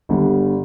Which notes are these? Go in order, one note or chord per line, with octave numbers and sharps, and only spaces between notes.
G1 D3 G3